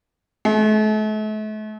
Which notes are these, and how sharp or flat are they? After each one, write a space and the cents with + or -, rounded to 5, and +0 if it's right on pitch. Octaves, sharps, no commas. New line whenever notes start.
A3 -40